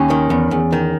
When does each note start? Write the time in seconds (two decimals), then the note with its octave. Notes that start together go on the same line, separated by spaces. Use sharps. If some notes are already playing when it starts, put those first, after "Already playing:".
Already playing: D#2 C#4
0.10 D#3
0.30 E2
0.51 E2
0.72 D#3